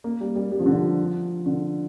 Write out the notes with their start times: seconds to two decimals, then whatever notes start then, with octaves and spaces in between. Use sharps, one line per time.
0.04 A#3
0.21 G3
0.35 G3
0.51 G3
0.59 F3
0.66 D3
0.73 F3
1.46 D3